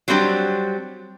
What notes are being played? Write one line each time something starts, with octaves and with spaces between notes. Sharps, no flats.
F#3 G3 C4 D4 G4